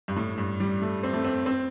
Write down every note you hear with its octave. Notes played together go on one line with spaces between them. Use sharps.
G2
A2
G2
G3
A3
C4
A3
C4
C4